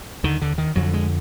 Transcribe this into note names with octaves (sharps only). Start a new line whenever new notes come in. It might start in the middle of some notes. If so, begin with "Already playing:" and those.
D#2 D3 D#3
D3
D#3
F2 D3 F#3
G#3